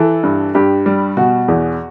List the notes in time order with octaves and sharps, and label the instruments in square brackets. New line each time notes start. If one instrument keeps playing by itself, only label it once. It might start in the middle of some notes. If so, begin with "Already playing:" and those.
Already playing: [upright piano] E3 A4
G2
G2 G4
G3
B2 F#4
E2